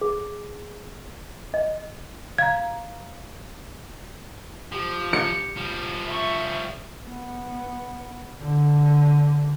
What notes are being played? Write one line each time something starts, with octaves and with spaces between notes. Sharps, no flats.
G#4
D#5
F5 A#5 G#6
F3 G4
C#7
F3 G3
E5 C#6
B3
D3